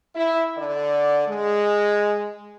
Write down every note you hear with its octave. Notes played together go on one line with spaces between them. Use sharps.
E4
D3 D5
G#3